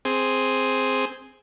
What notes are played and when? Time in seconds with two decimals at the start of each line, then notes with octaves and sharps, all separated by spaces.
0.05 C4 G#4